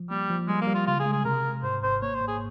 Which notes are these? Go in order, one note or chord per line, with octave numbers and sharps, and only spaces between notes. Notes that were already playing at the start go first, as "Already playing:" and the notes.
Already playing: F3
G3 A#3
F3
G3 G#3
A#3
G3
F4
C#3 F4
G#4
G#3
G#4
C3 A#4
C3
G#2 C5
G#1 C5
A#3 C#5
C5
G#2
G#4